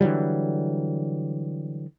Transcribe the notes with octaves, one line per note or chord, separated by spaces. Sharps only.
D3 E3 F#3 G3